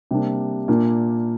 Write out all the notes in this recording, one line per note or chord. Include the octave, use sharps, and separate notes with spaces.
C3 G3 A#3 D4
A#2 A#3 D4